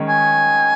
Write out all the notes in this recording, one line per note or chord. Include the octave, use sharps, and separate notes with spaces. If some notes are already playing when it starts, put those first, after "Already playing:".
Already playing: D#3 G#3 C#4
G#5